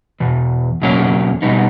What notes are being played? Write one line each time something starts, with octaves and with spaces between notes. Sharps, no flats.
E2 B2
E2 B2 F#3 A#3 C#4
B2 G3 B3 D#4